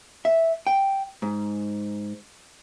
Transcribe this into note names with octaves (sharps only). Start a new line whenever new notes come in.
E5
G5
G#2